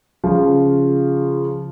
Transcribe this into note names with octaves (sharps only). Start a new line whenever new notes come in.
C#3 F3